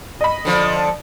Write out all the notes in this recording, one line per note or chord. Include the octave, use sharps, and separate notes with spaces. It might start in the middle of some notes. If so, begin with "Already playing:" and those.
D#5 B5
D3 F3